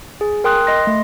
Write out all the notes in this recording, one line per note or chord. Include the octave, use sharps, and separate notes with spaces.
G#4
A#4 G5 C6 D#6 F#6
D#5 C6 A#6
A3